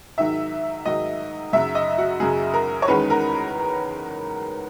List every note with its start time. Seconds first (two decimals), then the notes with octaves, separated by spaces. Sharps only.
0.18 G#2 D#3 F#3 E5
0.85 G#2 D#3 F#3 D#5
1.53 F#2 C#3 F#3 E5
1.75 D#5
1.98 F#4
2.20 F#2 C#3 F#3 G#4
2.54 A#4
2.82 C#5
2.88 E2 D#3 G#3 C#4 B4
3.10 A#4